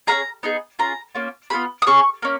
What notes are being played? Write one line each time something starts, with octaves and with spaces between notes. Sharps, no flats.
C#4 F4 G#4 A#5
B3 D#4 G#4
C#4 F4 G#4 A#5
A#3 C#4 F4
B3 F4 G#4 B5
D#6
C#4 G#4 C#6
A#3 C#4